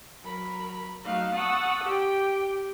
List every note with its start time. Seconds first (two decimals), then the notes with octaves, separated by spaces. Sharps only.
0.23 F#3 A#4 B5
1.04 F#3 A3 D#4 F5 F#6
1.35 F#5 A5 C#6 D#6 E6
1.84 G4 G5